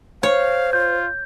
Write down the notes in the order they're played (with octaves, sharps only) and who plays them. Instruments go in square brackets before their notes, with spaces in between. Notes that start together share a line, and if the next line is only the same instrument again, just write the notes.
[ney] C5 [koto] C#5 [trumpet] F5
[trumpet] F4 [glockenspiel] G6